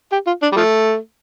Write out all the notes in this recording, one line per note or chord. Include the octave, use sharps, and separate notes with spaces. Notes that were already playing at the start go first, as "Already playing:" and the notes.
G4
F4
D4
G3
F3 A3